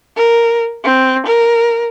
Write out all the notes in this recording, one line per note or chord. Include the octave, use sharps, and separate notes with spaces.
A#4
C4
A#4